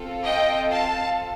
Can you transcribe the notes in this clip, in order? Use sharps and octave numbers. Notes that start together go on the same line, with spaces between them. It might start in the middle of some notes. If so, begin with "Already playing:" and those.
Already playing: C4 F4 A4
D#5 G5
F5 A5